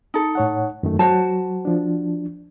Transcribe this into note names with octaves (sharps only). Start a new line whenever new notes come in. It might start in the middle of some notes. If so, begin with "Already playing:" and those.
D#4 A4
A2 C#5 F#5
F#2 D#3 A3
F#3 F#4 C5 A5
F3 D4